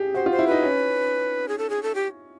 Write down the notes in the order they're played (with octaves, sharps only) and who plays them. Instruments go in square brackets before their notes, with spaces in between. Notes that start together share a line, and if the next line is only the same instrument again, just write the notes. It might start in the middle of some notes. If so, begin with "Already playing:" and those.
Already playing: [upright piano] G4 G#4
[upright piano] F#4 [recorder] C5
[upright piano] F4
[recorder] C5
[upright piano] E4
[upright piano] D#4 [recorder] B4
[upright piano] C#4
[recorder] G#4
A4
G#4
A4
G4